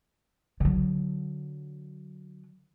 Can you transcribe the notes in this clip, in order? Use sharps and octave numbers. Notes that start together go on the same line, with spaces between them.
D3 F#3